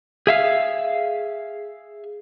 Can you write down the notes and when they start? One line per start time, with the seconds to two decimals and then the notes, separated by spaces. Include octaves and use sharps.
0.27 G#4 E5 F5